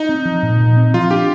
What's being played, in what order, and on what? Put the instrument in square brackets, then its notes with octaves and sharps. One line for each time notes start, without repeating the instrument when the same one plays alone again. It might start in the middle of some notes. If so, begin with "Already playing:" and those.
Already playing: [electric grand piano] D#4
[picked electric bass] C4
F3
A#2
A#2
C4
[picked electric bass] F3 [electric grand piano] F4
[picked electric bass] D4 [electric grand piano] G4